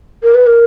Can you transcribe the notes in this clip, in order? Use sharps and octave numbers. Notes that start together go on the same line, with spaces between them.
A#4
B4
A#4